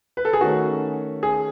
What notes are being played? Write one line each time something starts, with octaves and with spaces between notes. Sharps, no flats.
B4
A4
G#4
D#3 A3 C#4 F#4
G#4